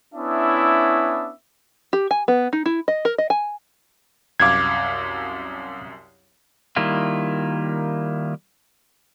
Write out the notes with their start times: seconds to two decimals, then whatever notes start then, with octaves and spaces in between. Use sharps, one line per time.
0.15 B3 C#4 D4 E4 E5
1.93 G4
2.11 G#5
2.28 B3
2.53 D#4
2.66 E4
2.88 D#5
3.05 A#4
3.18 D#5
3.30 G#5
4.40 C2 F#2 F5 D6 G#6
6.76 D#3 G3 A#3 E4 F4